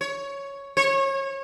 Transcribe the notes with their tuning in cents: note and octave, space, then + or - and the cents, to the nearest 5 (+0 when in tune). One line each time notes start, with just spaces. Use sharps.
C#5 +5
C#5 -30